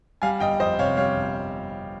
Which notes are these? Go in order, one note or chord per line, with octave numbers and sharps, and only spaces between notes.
G3 F5 G#5
G1 D#5 G5
F2 C5 D#5
C3 C#5 F5
G3 C#5 F5
G1